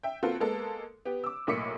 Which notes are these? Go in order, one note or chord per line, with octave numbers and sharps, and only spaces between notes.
E5 G5
A#3 C4 F4 F#4 A4 B4
G#3 A#3 B3 A4
B3 G4
D6 E6
B1 A2 A#3 D6 B6 C#7